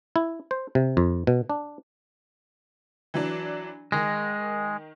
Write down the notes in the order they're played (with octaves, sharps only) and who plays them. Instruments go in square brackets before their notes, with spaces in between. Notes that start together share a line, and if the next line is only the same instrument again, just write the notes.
[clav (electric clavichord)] E4
C5
C3
F2
B2
D4
[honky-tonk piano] E3 F#3 D4
[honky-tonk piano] D#3 A#6 [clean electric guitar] G#3